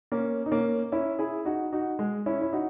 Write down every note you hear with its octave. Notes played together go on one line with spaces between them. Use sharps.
A#3 C#4
D#4
A#3 C#4
C#4 E4
E4 G#4
D#4 F#4
D#4 F#4
G#3
C#4 E4
E4
D#4 F#4